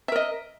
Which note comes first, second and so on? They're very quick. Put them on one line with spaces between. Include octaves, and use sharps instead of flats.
E5 A#4 D#5